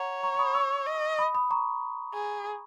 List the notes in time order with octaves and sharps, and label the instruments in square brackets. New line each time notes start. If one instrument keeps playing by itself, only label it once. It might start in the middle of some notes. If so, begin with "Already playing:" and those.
Already playing: [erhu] C#5 [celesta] F#5 A#5
[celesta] A#5 C#6
C#6
B5 D#6
C#6 E6
[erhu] D#5
[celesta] B5 D#6
B5 D#6
A#5 C#6
[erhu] G#4